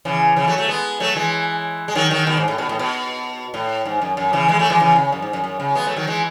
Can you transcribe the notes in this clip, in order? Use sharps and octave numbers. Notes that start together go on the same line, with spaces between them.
C#3 E3
C#3 E3
F#3 A3
F#3 A3
G#3 B3
F#3 A3
E3 G#3
G#3
D#3 F#3
D#3 F#3
B2 D#3
G#2
A2
B2
A2
B2
A2
G#2
F#2
F#2
C#3 E3
E3 G#3
F#3 A3
E3 G#3
C#3 E3
C#3
F#2
G#2
F#2
F#2
C#3
G#3 B3
F#3 A3
D#3 F#3
E3 G#3